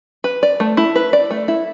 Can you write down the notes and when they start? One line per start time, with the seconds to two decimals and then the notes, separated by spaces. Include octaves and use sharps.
0.24 B4
0.43 D5
0.60 A3
0.77 E4
0.96 B4
1.13 D5
1.31 A3
1.48 E4